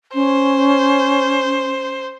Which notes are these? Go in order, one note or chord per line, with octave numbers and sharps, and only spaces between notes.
C#4 C5